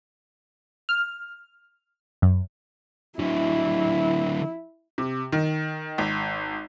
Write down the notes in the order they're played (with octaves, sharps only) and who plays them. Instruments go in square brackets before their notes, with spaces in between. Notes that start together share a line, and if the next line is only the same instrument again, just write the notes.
[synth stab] F6
F#2
[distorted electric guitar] D3 F#3 [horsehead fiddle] E4
[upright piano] C3
D#3
G#1